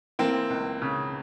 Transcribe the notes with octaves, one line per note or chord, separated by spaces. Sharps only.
E3 A#3 C4
C#2
C#3